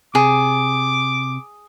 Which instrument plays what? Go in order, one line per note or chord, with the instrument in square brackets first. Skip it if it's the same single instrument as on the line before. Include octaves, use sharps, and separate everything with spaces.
[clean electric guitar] C3 [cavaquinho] G#4 [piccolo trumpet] D6